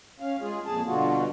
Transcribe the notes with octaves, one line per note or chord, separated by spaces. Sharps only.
C#4 F5
G#3 F4 G#4
F2 A#2 G#4 A5
G2 B2 D3 F4 F#4